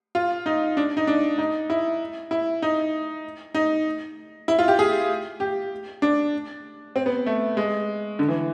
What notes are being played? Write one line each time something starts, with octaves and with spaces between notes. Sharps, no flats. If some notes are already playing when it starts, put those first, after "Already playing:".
F4
D#4
D4
D#4
D4
D#4
E4
E4
D#4
D#4
E4
F4
G4
G#4
G4
D4
C4
B3
A3
G#3
D3
E3